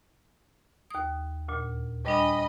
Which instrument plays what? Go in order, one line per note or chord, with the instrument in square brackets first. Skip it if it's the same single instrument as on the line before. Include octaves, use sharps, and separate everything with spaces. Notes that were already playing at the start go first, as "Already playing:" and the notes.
[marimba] D#2 D#6
D2 A#2
[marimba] G3 D4 G#5 [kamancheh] D#5 B5